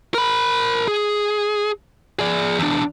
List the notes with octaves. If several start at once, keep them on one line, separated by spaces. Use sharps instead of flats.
A#4 B5
G#4
G#4 D5
E2 D4